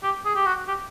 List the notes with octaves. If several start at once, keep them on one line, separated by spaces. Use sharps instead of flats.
G4
G#4
G4
F#4
G4